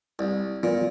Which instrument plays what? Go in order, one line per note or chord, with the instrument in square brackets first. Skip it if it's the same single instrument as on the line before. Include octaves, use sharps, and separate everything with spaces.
[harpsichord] C2
[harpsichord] A#2 [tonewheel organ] F3 B3 F4